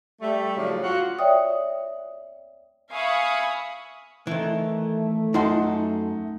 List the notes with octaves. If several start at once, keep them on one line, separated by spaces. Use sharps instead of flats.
G3 A3
A2 C#3 F3 F#3 D4
F4 F#4
C#5 D5 E5 G5 D#6
E5 F5 G#5 B5 C#6 D#6
D#3 E3 A3
F#2 D#4 A4 F#5 C6